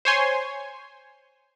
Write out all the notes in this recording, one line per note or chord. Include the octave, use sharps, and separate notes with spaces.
C5 C#5 G#5 C6